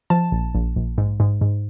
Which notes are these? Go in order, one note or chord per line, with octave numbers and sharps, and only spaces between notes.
F3 A5
A#1
A#1
A#1
G#2
G#2
G#2